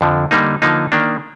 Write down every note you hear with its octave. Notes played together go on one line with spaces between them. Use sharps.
F2 D3 F3
D3 G3 A#3 D#4
D3 F3 A#3 D#4
D#3 A#3 D4